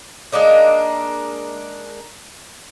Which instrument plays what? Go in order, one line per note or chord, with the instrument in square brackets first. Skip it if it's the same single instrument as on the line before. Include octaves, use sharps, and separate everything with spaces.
[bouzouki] G#3 A#3 D4 D#4